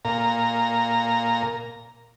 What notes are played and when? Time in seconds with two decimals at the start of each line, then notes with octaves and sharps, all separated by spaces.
0.05 A#2 A#5